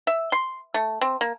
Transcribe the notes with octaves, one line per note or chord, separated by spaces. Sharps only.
E5
C6
A3
C4
A#3